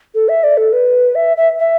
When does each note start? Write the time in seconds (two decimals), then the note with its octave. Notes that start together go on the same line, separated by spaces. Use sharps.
0.15 A4
0.28 E5
0.43 D5
0.57 A4
0.72 B4
1.15 E5
1.37 E5
1.59 E5